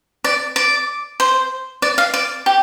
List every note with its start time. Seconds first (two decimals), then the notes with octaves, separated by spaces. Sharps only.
0.24 D5
0.56 D5
1.20 C5
1.82 D5
1.98 F5
2.14 D5
2.46 G4